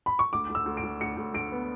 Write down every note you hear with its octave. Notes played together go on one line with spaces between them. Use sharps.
B5
C#6
D2 D6
D2
E6
D2
D7
D2
D2 C#7
D2
D2 D7
B3